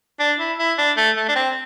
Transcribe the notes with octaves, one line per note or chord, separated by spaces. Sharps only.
D4
E4
E4
D4
A3
A3
D4
C4